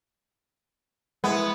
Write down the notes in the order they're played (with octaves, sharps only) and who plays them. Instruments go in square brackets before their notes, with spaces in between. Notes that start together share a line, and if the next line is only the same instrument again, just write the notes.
[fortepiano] G#3 E4 [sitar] B3